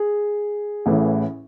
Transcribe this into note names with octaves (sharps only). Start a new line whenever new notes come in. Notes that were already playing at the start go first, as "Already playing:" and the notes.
Already playing: G#4
A1 A2 E3